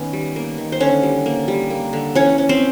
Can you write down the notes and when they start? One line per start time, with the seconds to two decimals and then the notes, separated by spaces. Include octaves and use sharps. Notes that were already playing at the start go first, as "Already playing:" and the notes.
Already playing: D#3 B3 C#4
0.13 G3
0.36 A#3
0.58 D#3
0.72 C5
0.80 D3 C#4 C#5
1.03 G3
1.26 A#3
1.48 G3
1.70 A#3
1.93 D3
2.15 E3 C#4 C#5
2.38 C#4
2.49 C4 C5